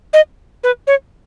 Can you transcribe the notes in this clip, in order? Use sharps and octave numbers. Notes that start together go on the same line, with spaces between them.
D#5
B4
C#5